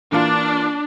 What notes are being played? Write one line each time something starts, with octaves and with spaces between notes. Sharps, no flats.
E3 A#3 D4 F4